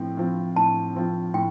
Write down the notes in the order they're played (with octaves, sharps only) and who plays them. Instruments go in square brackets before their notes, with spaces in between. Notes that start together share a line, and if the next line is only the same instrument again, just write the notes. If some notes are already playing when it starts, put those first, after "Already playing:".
Already playing: [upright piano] A2 F3 C4 [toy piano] G5
[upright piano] F3 C4 F4
[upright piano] A2 [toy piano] A5
[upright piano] F3 C4 F4
[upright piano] A2 [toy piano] G5